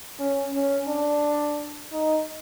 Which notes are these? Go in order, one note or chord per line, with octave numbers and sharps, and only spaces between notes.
C#4
C#4
D4
D#4